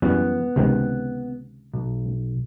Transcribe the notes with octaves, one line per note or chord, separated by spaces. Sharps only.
F#2 E3 G3 B3
C#2 C3 D#3
B1